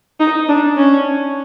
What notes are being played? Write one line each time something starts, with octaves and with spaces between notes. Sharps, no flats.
D#4
D4
C#4